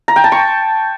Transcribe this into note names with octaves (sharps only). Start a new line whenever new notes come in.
A#5
G5
A5
C#6